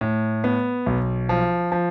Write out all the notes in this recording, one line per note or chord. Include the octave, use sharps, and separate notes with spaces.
A2
B3
B1
F3
F3